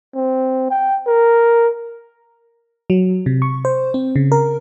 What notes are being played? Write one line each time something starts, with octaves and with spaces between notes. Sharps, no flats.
C4
G5
A#4
F#3
C3
C#6
C5
C4
C#3
A#4